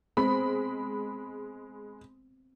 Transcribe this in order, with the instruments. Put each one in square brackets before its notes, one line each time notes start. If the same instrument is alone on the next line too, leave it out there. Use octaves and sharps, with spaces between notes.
[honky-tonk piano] G#3 B5 [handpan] B3 C4